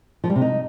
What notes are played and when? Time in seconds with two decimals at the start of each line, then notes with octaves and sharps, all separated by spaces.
0.24 F3
0.30 G3
0.36 C3
0.42 D#4